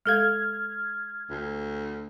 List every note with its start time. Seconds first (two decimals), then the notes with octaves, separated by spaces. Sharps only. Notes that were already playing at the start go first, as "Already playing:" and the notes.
0.05 G#3 A4 F5 F6 G#6
1.30 D2